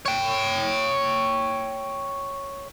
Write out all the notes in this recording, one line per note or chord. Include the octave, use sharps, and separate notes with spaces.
C#5 G5